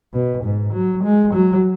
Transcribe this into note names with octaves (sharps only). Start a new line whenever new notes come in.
B2
G#2
F#3
G#3
F#3